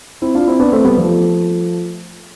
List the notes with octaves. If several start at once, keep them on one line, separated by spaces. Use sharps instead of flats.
C4 E4
D4 F4
C4 E4
B3 D4
A3 C4
G3 B3
F3 A3